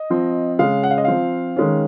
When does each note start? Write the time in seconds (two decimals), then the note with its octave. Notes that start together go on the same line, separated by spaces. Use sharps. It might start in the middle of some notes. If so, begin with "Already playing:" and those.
Already playing: D#5
0.10 F3 C4
0.59 C#3 G#3 C#4 F5
0.83 F#5
0.91 F5
0.98 D#5
1.05 F3 C4 F5
1.57 D#3 G#3 C#4